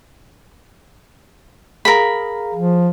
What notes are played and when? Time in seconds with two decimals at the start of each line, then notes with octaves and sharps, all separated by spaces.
1.85 G#4 A#4 F5 B5
2.54 F3